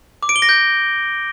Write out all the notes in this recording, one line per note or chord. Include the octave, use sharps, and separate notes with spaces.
D6
D7
G7
A#6
G6